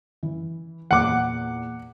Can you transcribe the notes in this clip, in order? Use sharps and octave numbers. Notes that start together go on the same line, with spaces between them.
E3
E2 A#2 F#5 D6